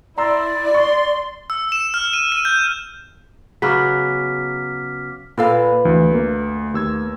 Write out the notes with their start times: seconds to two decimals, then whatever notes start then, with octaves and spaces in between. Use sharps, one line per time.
0.18 E4 D5 A#5 C6 E6
0.74 C6 C#6
1.50 E6
1.72 E7
1.94 F6
2.13 D#7
2.32 D#7
2.45 G6
3.62 C#3 F#3 B3 D6 F6 B6
5.38 A#2 F4 A4 B4 F5
5.85 D2 E3
6.12 A3 A#3
6.74 D#2 E6 G#6